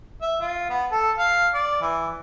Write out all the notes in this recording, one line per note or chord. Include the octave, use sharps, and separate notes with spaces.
E5
F4
B3
A4
F5
D5
E3